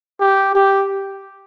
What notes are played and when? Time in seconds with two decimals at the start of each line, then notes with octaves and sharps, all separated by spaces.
0.20 G4
0.55 G4